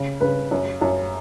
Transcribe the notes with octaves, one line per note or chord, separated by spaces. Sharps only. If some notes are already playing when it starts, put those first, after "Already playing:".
Already playing: C#3
C#3 B4
F#2
F#2